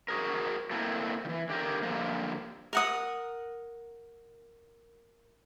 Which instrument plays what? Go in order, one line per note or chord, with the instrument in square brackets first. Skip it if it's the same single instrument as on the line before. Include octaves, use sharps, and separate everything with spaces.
[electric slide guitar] F#4 G#4 A#4
A3 A#3 C4 E4 A4
D#3 E3
D3 G4 A#4
D3 F3 G3 A#3
[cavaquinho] A#4 F#5 D#6